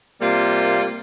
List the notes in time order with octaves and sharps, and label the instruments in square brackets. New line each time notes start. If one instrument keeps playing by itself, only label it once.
[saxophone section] C3 G3 A#3 F4